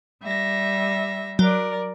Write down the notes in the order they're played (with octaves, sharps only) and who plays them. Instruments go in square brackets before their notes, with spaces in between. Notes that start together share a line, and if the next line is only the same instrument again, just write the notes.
[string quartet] G3 E5 A#6
[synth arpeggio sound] F#3 [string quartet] A#4 D5